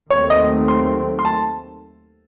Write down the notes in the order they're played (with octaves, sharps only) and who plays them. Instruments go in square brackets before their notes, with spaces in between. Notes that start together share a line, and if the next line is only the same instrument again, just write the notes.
[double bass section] D#2 D#3 F#3 A3 C4 [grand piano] C#5
[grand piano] D#5
C6
C6
A5